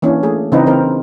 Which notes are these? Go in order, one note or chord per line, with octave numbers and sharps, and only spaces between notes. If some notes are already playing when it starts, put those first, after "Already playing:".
E3 A#3 C#4 D4
A3 G#4
C#3 E3 C4 D4 D#4 B4
E3 C4 A#4